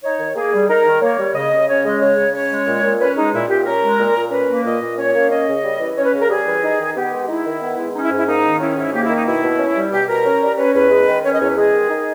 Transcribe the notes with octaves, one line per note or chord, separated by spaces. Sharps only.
D#4 C#5
D#3
A#3 G#4
G3
D#4 A#4
D#3
A#3 C#5
G3
C#3 D#5
C#3
C#4 C#5
G#3 D#5
C#3 C#5
C#3
C#4 C#5
G#3
A#2
A#2
C#4 B4
G#3 D#4
A#2 E4
A#2 G4
C#4 A#4
G#3
A#2
A#2
C#4 B4
A#3
A#2 D#5
A#2
C#4 C#5
A#3
C#4 D#5
C#3
G3
E3
C#4 C#5
B4
C#3
A#4
G3 G#4
E3
D#4
D#3
B3 G4
G#3
D#4 E4
D#3
B3
G#3
C#4 D#4
E4
G#2
E4
A#3 D#4
D#3
C#4 E4
G#2 E4
A#3 G4
E4
D#3
D#4
B2 E4
B2
C#4
G3
B2 G4
B2 A#4
C#4
G3
C#4 B4
E2 B4
G#3
D#3
C#4 C#5
D#5
E2 C#5
B4
G#3 G#4
D#3
D#4